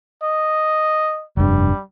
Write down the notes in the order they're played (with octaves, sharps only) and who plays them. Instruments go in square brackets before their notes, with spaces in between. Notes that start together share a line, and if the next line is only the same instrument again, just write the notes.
[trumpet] D#5
[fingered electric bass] F1 G2 [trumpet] G3